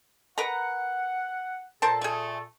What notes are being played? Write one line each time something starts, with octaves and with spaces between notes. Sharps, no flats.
A#4 B4 F#5 A#5
A#2 A4 A#4 C5 A5
A3 G#4